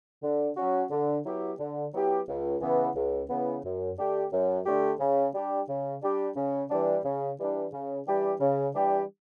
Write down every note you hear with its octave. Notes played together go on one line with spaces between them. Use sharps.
D3
F#3 C#4 F#4
D3
F#3 B3 E4 G4
D3
F#3 B3 E4 G4
C#2
C#3 E3 B3
C#2
C#3 E3 B3
F#2
D3 A3 D4 G4
F#2
D3 A3 D4 G4
C#3
G3 D4 G4
C#3
G3 D4 G4
C#3
E3 G3 D4
C#3
E3 G3 D4
C#3
E3 G3 D4 G4
C#3
E3 G3 D4 G4